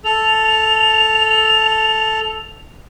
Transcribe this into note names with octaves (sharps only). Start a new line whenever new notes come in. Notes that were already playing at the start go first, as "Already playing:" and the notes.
A4 F7